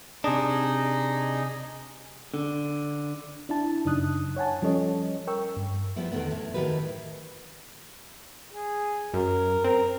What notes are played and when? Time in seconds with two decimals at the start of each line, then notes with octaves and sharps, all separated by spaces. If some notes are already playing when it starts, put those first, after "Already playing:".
0.24 C3 D4 D#4 G#4 D#5
2.34 D3
3.49 D4 E4 A5
3.85 F#2 C#3 D4 D#4 D#6 F#6
4.36 C#5 F#5 G#5 A5
4.62 F3 G3 C#4 A4 C#5 D#5
5.27 A#4 G5 C#6 E6
5.57 G2
5.96 F3 G3 B3 E4
6.12 E2 D3 D#3 F#3 A3 B3
6.31 A2
6.54 A2 D#3 F#4 G4 B4
8.52 G#4
9.14 F#2 A#4
9.64 C4 A#4